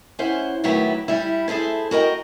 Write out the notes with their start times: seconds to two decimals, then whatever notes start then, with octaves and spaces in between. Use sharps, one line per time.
0.19 C#4 E4 C5 F#5
0.64 A2 D#3 F#3 B3 E4 G4
1.08 G3 E4
1.48 E4 G#4 A4 C5
1.91 F#4 A#4 D#5 G5